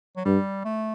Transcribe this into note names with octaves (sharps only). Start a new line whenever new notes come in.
F#3
G2 G3
A3